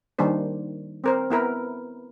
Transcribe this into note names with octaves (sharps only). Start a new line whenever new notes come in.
D#3 G3 A#3 D4 C5
C4 A#4 C5
B3 E4 A#4 B4